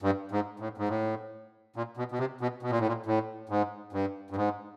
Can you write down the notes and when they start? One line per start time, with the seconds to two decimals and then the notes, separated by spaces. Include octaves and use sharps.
0.02 G2
0.32 G#2
0.60 A2
0.78 G#2
0.89 A2
1.76 A#2
1.97 B2
2.12 B2
2.19 C3
2.41 B2
2.63 B2
2.71 A#2
2.79 A2
2.87 A#2
3.06 A2
3.49 G#2
3.93 G2
4.30 G2
4.36 G#2